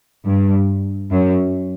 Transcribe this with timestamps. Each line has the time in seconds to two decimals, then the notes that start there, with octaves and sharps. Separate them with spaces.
0.26 G2
1.11 F#2